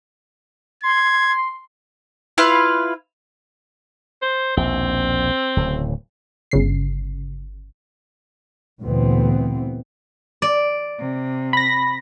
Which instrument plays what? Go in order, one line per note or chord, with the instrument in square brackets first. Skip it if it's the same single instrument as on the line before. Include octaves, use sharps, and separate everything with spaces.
[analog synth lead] C6 [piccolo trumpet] G#6
[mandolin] E4 F4 B4 F5
[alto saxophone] C5
[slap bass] A#1 D#2 B2 [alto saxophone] C4
[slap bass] D1 A2 C#3
[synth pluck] G1 C#3 C7
[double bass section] D2 A#2 E3 B3 C4
[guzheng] D5
[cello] C3
[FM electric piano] B5 A#6